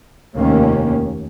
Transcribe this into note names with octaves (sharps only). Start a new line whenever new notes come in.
F1 D#2 D#3 A#3 C#4